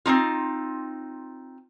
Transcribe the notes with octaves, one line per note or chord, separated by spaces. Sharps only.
C4 C#4 D#4 F4